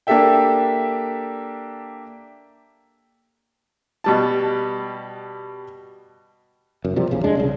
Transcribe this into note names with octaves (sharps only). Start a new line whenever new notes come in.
A#3 D4 G4 A4 E5 G5
B2 G3 A5
F#1 F#2
C3 F3 G3
A#1 E2 C#3
F1 G#3 D4
C2 C#3